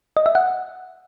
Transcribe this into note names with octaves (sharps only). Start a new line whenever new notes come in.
D#5
E5
F#5